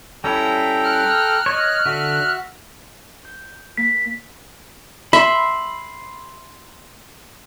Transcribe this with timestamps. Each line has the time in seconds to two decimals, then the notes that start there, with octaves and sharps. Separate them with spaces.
0.24 G3 C#4 E4 A4 G5 A#5
0.84 F6 F#6
1.46 C#5 D#5
1.86 D3 F#4 E5
3.25 G6
3.78 A#3 B6
5.13 E5 B5 C6